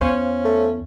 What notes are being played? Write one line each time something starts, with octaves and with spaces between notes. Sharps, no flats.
E2 C#4 C5 C#5 F5
A3